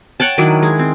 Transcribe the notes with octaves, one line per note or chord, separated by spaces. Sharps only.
C#5 F#5 G5 A5
D#3 F#3 D4 E4
G#3
C4